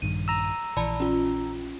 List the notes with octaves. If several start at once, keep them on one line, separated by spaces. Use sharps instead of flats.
A#1 G2 D#3 D#7
A#5 E6
A#1 E3 D5 A5 B5
C#4 F4